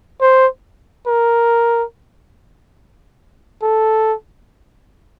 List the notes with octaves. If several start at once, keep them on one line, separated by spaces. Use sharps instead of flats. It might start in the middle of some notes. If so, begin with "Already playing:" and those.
C5
A#4
A4